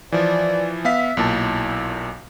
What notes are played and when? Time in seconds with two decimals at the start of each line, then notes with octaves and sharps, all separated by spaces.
0.12 E3 F3 D5
0.85 B3 E5 F5 B6
1.17 B1 A#2 E4 A5